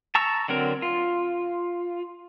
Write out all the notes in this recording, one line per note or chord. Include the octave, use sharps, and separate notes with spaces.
A5 A#5 C#6 E6
D3 F#3 C4 A#4
F4